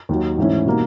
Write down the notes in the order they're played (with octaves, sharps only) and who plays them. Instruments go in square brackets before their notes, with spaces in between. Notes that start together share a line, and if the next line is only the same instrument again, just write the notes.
[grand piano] D#2 D#3 F#3
G#2 E3 A3 C#4 E4
B2 G3 A#3 D#4